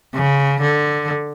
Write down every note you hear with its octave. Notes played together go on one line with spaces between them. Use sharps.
C#3
D3